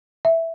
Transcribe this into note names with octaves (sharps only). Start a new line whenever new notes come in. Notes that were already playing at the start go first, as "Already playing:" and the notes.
E5